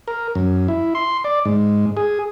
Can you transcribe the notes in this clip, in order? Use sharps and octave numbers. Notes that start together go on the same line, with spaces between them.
A#4
F#2
E4
C6
D5
G#2
G#4